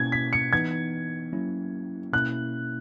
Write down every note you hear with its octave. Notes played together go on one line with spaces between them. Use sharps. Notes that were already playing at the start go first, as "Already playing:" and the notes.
Already playing: B2 A#3 C#4 E4 G#6
B6
C#7
E3 B3 D#4 G#6
F#3 A#3 C#4 E4
B2 A#3 C#4 E4 F#6